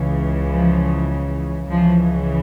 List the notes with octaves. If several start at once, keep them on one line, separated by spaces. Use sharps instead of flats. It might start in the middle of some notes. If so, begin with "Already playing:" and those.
Already playing: C#2 C#3 E3
F3
C#2 C#3 E3 F3